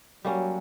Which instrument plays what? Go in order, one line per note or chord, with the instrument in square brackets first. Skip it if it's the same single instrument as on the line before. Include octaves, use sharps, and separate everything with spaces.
[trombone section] F#3 [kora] G3 A#3 C#4